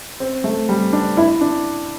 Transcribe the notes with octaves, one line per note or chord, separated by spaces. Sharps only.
C4
A3
G3
D4
E4
D4